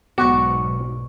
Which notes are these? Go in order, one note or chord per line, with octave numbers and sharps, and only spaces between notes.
B1 G#2 B3 F#4 D5 C#6 D6